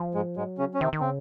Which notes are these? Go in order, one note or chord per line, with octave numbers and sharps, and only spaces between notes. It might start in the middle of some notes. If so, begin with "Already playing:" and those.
Already playing: F3
G#2 G#3
G#2 F#3 G#3
C#3 C#4
C#4
C3 D#3 C4
D#3
C#3 C4